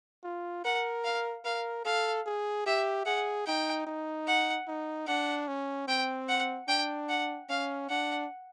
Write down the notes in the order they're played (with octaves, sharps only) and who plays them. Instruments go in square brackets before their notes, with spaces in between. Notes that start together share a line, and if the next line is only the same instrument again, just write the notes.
[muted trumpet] F4
[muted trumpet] A#4 [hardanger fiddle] F#5
[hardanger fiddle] F5
[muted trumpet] A#4 [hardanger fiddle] F5
[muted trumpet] A4 [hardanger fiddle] F5
[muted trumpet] G#4
[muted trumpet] G4 [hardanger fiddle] E5
[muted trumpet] G#4 [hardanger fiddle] F#5
[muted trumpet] D#4 [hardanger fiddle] G5
[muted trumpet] D#4
[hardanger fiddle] F#5
[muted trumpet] D#4
[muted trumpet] D4 [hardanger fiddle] F#5
[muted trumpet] C#4
[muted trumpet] C4 [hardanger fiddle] G5
[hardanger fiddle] F#5
[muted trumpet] D4 [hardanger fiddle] G5
[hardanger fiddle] F#5
[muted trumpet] C#4 [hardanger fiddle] F5
[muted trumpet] D4 [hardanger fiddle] F#5